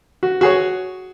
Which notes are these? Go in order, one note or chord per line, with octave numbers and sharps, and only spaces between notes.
F#4
F#4 G#4 C#5